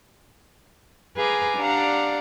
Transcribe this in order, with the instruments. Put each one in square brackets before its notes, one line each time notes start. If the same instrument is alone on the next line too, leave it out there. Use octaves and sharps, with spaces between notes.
[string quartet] G#4 B4 F5 G#5 A#5 D6
D4 G4 D5 F5 F#5 A#5